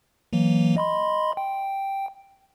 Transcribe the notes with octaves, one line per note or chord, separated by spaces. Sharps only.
E3 F#3 A#3
D#5 B5 C6
G5